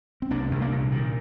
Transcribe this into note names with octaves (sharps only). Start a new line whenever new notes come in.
C4
C2 A#3 D4
C2
A#3 D4
A#2
A#2 D#3